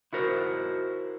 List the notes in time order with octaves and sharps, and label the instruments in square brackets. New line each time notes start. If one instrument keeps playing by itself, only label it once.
[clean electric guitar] E4 F#4 A#4 C5